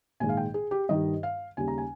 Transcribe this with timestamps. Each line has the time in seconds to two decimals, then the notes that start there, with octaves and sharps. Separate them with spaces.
0.20 A#1 G#2 D#3 G#3 G#5
0.29 F5
0.37 G5
0.54 G#4
0.71 G4
0.89 G2 D#3 G3 D#5
1.23 F5
1.57 D#2 C#3 G3 C#4 G#5
1.68 A#5
1.78 G#5